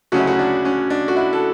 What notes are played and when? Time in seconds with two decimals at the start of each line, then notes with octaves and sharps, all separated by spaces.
0.12 D2 C#3 F#3 C#4 F#4
0.19 E4
0.27 F#4
0.39 D4
0.65 C#4
0.90 D4
1.08 F#4
1.16 E4
1.33 A4